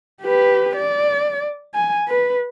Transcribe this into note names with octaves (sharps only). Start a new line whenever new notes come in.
G4 B4
D5
G#5
B4